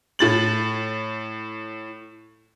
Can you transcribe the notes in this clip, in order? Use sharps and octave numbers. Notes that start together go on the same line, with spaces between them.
A2 A6 F#7